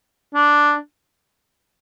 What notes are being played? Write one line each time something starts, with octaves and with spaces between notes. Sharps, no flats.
D4